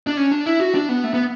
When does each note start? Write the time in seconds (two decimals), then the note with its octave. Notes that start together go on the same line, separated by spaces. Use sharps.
0.07 D4
0.17 C#4
0.32 D4
0.46 E4
0.60 F#4
0.74 D4
0.89 B3
1.04 A3
1.14 B3